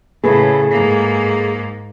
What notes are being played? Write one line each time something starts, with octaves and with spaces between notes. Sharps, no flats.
A2 C#3 G#4 A4 B4
G#2 A#3